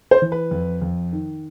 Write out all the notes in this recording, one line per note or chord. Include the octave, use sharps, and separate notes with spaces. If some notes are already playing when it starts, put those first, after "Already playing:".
C5
E3
B4
F2
F2
D#3